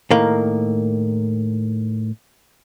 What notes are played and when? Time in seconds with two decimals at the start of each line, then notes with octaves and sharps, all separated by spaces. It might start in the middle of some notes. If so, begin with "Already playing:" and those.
0.11 A2 D#3 A#3